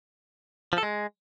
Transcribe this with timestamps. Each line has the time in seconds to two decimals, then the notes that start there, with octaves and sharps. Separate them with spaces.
0.73 F3
0.78 A4
0.83 G#3